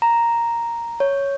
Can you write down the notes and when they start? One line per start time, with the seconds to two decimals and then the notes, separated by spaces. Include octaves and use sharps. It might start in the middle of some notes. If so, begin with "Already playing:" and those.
0.02 A#5
1.00 C#5